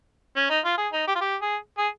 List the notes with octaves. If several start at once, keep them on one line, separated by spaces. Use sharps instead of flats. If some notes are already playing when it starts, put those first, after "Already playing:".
C#4
D#4
F4
G#4
D#4
G4
F4
G4
G#4
G#4